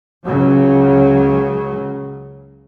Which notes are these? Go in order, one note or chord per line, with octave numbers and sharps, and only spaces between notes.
C#2 C#3 F#3